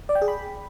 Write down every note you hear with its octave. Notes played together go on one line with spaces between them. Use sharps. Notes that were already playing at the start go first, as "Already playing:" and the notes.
D5
G5
G#4
B5